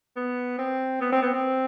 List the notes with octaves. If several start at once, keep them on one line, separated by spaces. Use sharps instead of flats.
B3
C4
B3
C4
B3
C4